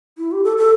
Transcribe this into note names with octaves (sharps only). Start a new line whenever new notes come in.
E4
G4
A4
A4